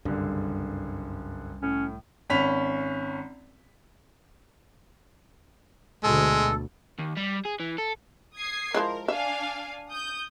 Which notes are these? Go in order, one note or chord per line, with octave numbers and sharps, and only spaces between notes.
F#1 C2 G2 D3
A2 C#4
G#1 C#4 B5 B6 F7
D2 B2 G#3 A4
D#2
G3
G#4
E3
A4
D#6 G#6 C7
F3 G#3 E4 A#4
D4 E5 F5 G#5
D#6 G6